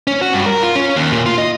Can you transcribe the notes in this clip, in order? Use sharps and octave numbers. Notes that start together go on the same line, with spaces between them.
C#4
F#4
G2
A#4
F4
C#4
D#2
A#2
F4
D#5